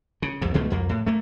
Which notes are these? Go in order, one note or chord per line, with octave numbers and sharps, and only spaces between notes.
C#3
C2 F2 G#2
C#2 B2 D3 A3
C2 F2 A#3
A2
A3 A#3